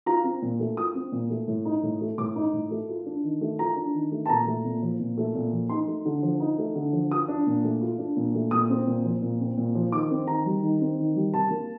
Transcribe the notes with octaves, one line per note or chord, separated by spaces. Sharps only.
F4 A#5
C4
A#2
A3
F4 D#6
C4
A#2
A3
A2
D#4
A2
A3
A2 D6
D#4
A2
A3
F4
D4
D#3
A3
F4 A#5
D4
D#3
A3
A5
A#2 A#5
A3
A#2
F3
A#2
A3
A#2
F3
D#4 C6
A3
D3
F3
D#4
A3
D3
F3
F4 D#6
D4
A#2
A3
F4
D4
A#2
A3
A#2 D#6
C4
A#2
F3
A#2
C4
A#2
F3
D#3 D6
C4
D#3 A#5
G3
D#3
C4
D#3
G3
C3 A5
A#3